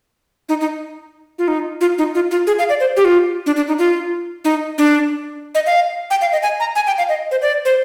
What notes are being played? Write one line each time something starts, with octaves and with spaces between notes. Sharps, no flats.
D#4
D#4
F4
D#4
F4
D#4
F4
F4
G#4
F5
D5
C5
G4
F4
D4
D4
D#4
F4
D#4
D4
D#5
F5
G5
F5
D#5
G#5
A#5
G#5
G5
F5
D#5
C5
D5
C5